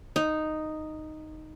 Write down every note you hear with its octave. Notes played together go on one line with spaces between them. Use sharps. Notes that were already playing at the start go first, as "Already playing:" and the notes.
D#4